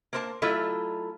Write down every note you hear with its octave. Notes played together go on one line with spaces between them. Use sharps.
A#3 A#4 C5 D#5 A5
F#3 A3 E4 F4 A4 D#5